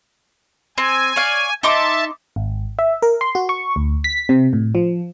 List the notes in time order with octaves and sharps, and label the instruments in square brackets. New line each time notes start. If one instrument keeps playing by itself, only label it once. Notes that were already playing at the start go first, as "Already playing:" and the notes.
[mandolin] C4 [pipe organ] G#5
[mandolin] C#5 D5 F5
[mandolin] D#4 C6 D6 [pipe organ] E5 A5
[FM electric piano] G#1
E5
A#4
C6
F#4
C#6
D2
B6
C3
A2
F3